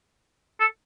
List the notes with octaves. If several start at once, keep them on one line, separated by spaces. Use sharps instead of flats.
A4